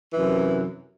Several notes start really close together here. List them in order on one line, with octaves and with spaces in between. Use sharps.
E3 C3 F#2